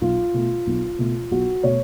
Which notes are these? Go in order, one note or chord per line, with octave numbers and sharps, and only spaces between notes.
B1 F4
B2 A3
B1
B2 A3
B1 F#4
B2 A3 C#5